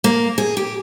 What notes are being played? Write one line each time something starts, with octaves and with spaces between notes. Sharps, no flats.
A#3
G#4
G4